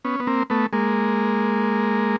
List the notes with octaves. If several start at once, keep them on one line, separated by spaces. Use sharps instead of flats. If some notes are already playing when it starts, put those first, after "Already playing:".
B3 C#4
B3
A#3 C4
A3 B3
G#3 A#3